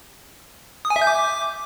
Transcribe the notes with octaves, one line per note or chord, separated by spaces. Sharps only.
D#6
G#5
E5
G6
D6